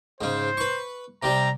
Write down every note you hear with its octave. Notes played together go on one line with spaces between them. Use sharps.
G#2 C#3 C5
B4 C#6
C3 G3 A#5